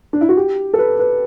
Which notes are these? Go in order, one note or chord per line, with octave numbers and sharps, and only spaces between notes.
D4
E4
F#4
G4
A4
B4
B4